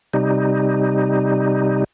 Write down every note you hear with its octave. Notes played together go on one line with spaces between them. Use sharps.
C3 G3 D#4